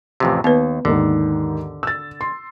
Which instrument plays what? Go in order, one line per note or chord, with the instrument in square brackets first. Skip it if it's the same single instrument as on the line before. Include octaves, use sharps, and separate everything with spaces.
[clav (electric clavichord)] A1 F2 C3
[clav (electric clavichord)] D#2 [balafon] B3 B4
[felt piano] D#2 G#2 D#3 [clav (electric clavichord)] D3
[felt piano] E6 A6
C6